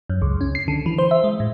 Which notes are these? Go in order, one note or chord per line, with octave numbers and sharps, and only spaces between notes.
F#2
C#2
C#4
C7
D3
E3
C5
E5
G#3
A2